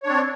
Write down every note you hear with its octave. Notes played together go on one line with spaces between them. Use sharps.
C4 D4 C#5